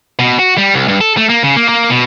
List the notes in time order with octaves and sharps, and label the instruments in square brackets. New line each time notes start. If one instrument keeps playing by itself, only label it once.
[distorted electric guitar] B2
F#4
G3
C2
G2
A4
A3
A#3
C#3
A#3
A#3
B2